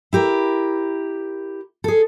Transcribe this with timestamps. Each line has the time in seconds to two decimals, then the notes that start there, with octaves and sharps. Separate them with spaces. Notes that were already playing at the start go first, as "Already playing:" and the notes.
0.13 E4 G4 A#4
1.84 G#4 A4